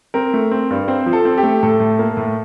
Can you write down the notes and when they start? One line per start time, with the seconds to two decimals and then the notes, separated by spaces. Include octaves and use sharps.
0.14 C4 A#4
0.34 A3
0.51 C4
0.70 G2
0.88 C4 C5
1.06 F3
1.13 A4
1.25 C4
1.38 G4
1.43 A3
1.63 A2 A4
1.80 A2
1.99 A#3
2.17 A2